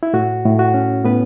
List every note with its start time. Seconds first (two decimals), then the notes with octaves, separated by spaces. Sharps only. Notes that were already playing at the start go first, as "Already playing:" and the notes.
0.03 E4
0.14 A2 F#4
0.45 A2
0.59 F#4
0.74 C#4
1.05 A2 B3 B4